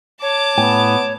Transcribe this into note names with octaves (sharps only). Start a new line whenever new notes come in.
C#5 A5 D6
A2 B3 G5 G#5